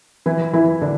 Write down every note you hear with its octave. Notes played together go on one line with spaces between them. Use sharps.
E3 E4
E3 E4
D3 D4